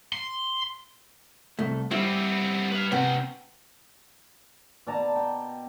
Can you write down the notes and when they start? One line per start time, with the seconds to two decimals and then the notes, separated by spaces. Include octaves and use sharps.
0.13 C6
1.59 C2 A3
1.91 G3 B3 C4 E4
2.72 B4 F5
2.92 C3 B3 C#4 G5
4.87 B2 D5 A5 A#5
5.16 G5